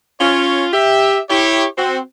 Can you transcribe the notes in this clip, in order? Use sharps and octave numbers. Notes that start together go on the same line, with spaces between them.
C#4 F4 C#5
G4 E5
E4 G4 C#5
C4 F#4